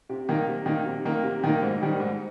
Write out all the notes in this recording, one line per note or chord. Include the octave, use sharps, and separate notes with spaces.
C3
D#3 A#3
C3
D#3 A#3
C3
D#3 A#3
C3
D#3 A#3
G#2
D#3 G3
G#2